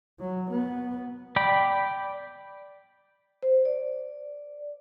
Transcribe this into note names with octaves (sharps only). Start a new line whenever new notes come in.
F#3
B3
D5 G5 B5
C5
D5